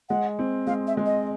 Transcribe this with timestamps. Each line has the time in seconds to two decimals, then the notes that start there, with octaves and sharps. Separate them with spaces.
0.09 G#3 F#5
0.39 C4
0.67 G#3 F5
0.87 E5
0.97 G#3
1.06 D#5